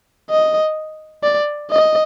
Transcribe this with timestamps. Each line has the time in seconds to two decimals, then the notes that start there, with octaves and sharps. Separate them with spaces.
0.30 D#5
1.23 D5
1.71 D#5